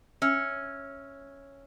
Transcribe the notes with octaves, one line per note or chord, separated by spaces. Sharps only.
C#4 E5 E6 F6